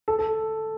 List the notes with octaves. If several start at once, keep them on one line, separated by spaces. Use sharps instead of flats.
A4
A4